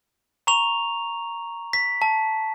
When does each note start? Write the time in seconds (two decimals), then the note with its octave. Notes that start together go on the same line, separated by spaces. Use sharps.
0.47 A#5 C#6 F7
1.73 B6
2.02 A5